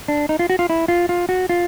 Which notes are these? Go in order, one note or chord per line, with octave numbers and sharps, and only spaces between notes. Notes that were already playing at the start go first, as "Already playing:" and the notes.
D4
D#4
F4
F#4
F4
E4
F4
F4
F#4
F4